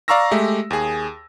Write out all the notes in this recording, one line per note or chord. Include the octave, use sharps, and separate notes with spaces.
D5 F5 A#5 C#6 E6 A#6
G#3 A3 G4 E5
D#2 G#4